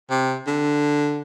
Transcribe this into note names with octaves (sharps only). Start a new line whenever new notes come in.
C3
D3